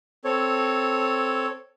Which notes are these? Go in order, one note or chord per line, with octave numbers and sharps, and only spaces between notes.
C4 A4 C#5